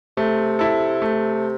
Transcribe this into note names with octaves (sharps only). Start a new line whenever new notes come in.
C3 A3
E4 A4
A3